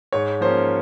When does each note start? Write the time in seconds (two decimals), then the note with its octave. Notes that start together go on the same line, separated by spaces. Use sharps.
0.12 G#2 C#5
0.41 F3 A#3 C#4 C5